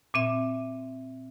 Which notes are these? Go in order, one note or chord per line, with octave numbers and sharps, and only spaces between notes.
A#2 C4 E5